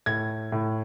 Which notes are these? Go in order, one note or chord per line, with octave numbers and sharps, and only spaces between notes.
A2 G#6
A2